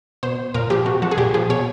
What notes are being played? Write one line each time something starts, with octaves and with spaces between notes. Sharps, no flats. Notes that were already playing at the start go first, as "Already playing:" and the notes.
B2 C5
A#2 A#4
F3 G4
C3 F#4
F3 F#4
G#4
A#2 G4
F3 G#4
B2 C#5